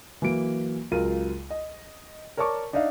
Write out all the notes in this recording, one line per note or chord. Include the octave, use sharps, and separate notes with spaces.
E3 F#3 A#3 D7
C#2 F#3 F4 A#4 D#7
D#5
A#4 C#5 D5 A5 C#6 D6
D4 D#4 D5 E5 F5